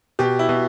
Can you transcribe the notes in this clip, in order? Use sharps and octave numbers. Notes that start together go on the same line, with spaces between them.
B2 G4
E4
B2